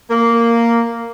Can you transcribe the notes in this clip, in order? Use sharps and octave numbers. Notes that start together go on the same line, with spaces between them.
A#3